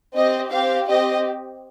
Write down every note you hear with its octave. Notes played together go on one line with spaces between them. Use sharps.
C4 G4 D#5
C4 G4 F5
C4 G4 D#5